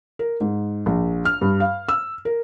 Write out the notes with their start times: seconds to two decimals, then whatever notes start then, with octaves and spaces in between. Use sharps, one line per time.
0.19 A#4
0.40 G#2
0.86 A#1
1.25 F6
1.41 G2
1.60 F5
1.89 E6
2.25 A#4